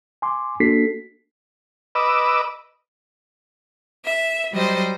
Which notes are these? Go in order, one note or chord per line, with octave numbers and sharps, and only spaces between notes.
G#5 C6 D6
A#3 D4 F#4 A4 B6 C7
B4 D#5 D6 E6
E5
F#3 G3 C5 D#5